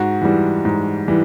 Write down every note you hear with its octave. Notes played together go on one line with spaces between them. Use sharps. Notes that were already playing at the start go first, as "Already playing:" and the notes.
Already playing: G#2 F#4
E3 G3
G#2
E3 G3